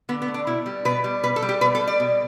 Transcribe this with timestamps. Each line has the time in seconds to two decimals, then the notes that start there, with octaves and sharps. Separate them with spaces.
0.09 D3 B3
0.22 B3
0.28 A3
0.34 D4
0.47 B2 E4
0.66 G3
0.85 B2 B4
1.04 G3
1.23 B2 B4
1.36 A4
1.42 G3
1.49 G4
1.61 B2 B4
1.75 A4
1.81 G3
1.87 D5
2.00 B2